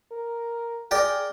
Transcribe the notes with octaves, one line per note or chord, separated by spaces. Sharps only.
A#4
G#4 A#4 D5 G5